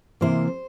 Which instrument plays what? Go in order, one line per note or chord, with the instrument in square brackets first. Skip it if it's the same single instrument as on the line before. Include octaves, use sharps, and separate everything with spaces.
[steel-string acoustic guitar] C3 E3 A#3 C5